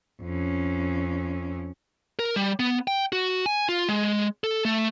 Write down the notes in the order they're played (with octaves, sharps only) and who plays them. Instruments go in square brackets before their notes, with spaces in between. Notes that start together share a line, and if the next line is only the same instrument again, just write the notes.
[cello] F2 C#4
[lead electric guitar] A#4
G3
B3
G5
F#4
G#5
F4
G#3
A4
A3